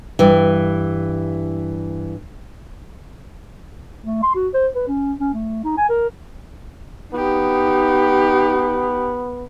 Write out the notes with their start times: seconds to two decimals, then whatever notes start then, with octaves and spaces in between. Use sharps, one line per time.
0.19 G2 E3
4.04 A3
4.23 C6
4.35 F#4
4.54 C5
4.75 B4
4.88 C#4
5.20 C#4
5.34 A3
5.64 D#4
5.77 G#5
5.89 A#4
7.14 B3 D#4 G4